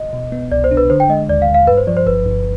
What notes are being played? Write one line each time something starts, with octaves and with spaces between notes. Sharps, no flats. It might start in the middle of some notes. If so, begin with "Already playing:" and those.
Already playing: D#5
B2
B3
C2 D5
C5
D4
B4
D3 C5
G5
G#3 D#5
D#2 D5
F5
D#2
F5
G2 B4
C5
F3 D5
C5
G1 B4
G1